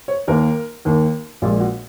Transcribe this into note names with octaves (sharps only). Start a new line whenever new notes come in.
C#5
D#2 D#3 A#3 A#4
D#2 D#3 A#3
A#1 A#2 G#3 F4
F#4